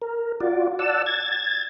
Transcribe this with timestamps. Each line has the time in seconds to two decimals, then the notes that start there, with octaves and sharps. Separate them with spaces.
0.02 A#4
0.40 F4 F#4 D5
0.79 D5 F#5 A5 E6
1.06 G#6 A6